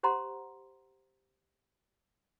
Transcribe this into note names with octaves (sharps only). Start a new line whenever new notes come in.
G4 C5 F#5 A#5 C6